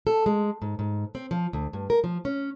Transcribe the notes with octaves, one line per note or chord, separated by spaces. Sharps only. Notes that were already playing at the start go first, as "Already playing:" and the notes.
A4
G#3
G#2
G#2
C4
F3
D2
G2
A#4
F3
C#4